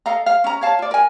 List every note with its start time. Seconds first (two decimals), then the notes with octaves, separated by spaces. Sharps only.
0.06 A4 D#5 F5 A#5
0.26 F5
0.44 C#4 A#5
0.61 C#5 F5 A5
0.79 F4 D5
0.91 A#4 G#5